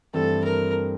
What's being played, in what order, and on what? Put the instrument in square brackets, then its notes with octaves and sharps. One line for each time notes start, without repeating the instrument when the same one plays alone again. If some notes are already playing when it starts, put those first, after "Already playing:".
[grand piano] G2 E3 A3 C4 [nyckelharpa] A4
[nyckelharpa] A#4